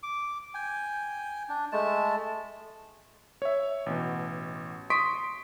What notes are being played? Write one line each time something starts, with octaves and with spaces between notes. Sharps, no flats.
D6
G5 G#5
D4
G#3 A3 A5
C#5 E5
A1 B2
C6 C#6 D#6 B6 D7